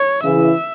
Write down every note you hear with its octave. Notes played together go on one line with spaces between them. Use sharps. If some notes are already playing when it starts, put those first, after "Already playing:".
Already playing: C#5
C#3 E3 E5